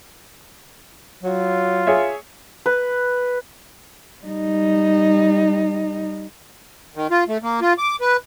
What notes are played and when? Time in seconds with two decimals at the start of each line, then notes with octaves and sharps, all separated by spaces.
1.24 F#3 F4
1.87 G#4 C#5 E5
2.66 B4
4.25 G3 D#4
6.96 D#3
7.11 F4
7.28 A3
7.43 A#3
7.61 F4
7.78 D6
8.01 B4